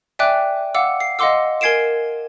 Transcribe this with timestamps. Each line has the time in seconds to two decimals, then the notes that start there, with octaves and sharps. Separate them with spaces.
0.19 D5 E5 G5 G#5 D6 F#6
0.74 F5 F#5 D6 E6
1.00 C7
1.19 D#5 F5 F#5 C6 D6 E6
1.61 A#4 G#5 G#6 C7 D7 E7